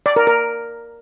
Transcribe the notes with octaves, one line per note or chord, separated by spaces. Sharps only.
D5
A#4
A#4